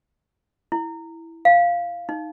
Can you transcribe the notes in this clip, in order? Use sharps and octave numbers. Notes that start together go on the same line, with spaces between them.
E4
F5
D#4